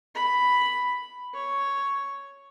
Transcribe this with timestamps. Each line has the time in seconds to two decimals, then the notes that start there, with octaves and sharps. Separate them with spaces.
0.15 B5
1.34 C#5